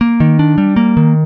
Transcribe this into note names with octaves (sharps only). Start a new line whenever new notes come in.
A#3
D#3
D4
G3
A#3
D#3